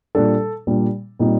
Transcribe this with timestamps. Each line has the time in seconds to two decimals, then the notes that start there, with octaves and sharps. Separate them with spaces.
0.15 A#2 G3 D4 A4
0.67 A#2 G3 D4
1.19 A#2 G3 C4 D#4